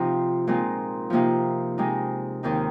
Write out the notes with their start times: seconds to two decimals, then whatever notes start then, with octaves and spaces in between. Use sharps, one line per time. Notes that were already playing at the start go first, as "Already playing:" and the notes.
Already playing: C3 F3 C4 D#4
0.47 A#2 G#3 C4 D#4
1.10 C3 F3 A#3 D#4
1.78 C3 G#3 D#4
2.43 D#2 D#3 C4 D#4